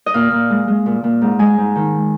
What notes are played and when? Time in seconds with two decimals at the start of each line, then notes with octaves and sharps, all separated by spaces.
0.06 D#5
0.14 A#2 F5
0.32 A#2
0.50 G#3
0.68 G#3
0.86 A#2
1.04 A#2
1.22 G#2
1.39 G#3 G#5
1.58 G#2
1.75 D#3